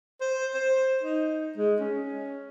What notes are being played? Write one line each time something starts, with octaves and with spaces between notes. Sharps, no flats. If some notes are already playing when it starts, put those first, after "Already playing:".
C5
C5
D#4
G#3
C#4